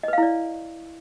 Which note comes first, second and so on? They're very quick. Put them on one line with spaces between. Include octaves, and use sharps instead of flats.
D#5 B4 F5 E4 D5